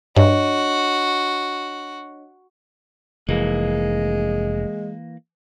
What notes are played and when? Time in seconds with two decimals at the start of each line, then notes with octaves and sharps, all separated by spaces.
0.16 G2 D4 F#4 C#5 D#5
3.29 F1 E3 G#3 A#3